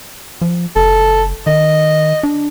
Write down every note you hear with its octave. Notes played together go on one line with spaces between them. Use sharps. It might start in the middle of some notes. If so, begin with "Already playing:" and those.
F3
F#1 A4
D#3 D#5
D4